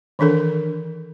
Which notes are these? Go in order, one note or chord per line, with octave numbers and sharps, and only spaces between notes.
D#3 E3 D4 A4 A#4